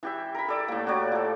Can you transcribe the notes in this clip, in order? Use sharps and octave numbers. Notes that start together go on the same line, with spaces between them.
E3 G4 E5
A#4 B5
A4 D5
A2 A#3
F#4 G4 C#5 D5
F3 A4